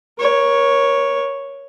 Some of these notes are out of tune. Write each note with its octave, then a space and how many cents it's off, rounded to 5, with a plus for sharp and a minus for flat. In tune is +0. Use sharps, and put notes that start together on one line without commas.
A#4 +35 C#5 +0